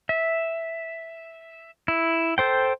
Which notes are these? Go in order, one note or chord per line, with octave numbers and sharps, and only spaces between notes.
E5
E4
A4 C5 G5